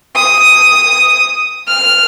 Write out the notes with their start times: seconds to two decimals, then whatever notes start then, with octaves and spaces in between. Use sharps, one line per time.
0.16 D#6
1.68 F6